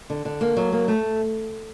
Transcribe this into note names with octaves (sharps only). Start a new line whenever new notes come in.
D3
D3
A#3
F#3
A#3
A3